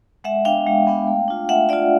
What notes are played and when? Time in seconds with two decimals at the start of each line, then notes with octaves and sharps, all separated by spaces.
0.24 G#3 E5 F#5
0.45 B3 D4 F5 G5
0.67 G#3
0.87 B3 D4
1.07 A3
1.28 D4 F4
1.49 A3 E5 F#5
1.69 D4 F4 D5 E5